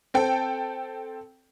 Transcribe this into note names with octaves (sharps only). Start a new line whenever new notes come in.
C4 A4 G5